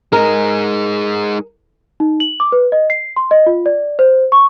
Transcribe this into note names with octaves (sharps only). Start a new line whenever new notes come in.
G#3 D#4 A#4
D#4
F#7
D6
B4
D#5
C7
C6
D#5
F4
D5
C5
C#6